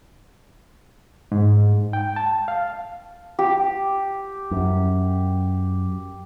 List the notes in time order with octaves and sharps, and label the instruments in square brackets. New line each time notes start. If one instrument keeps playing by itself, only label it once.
[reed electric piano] G#2
G5
A5
F5
[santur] G4
[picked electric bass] F#2